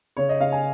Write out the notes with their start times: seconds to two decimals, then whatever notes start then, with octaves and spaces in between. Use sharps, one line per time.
0.17 C#3 C#5
0.29 D#5
0.41 C#3 F5
0.52 G#5